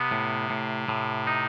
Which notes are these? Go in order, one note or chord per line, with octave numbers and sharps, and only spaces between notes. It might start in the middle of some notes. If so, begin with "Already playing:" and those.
Already playing: C3 B3
A2
A2
A2
D#4